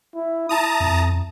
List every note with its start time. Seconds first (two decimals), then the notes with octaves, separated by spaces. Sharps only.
0.15 E4
0.49 E4 A5 A#5 D#6
0.80 F2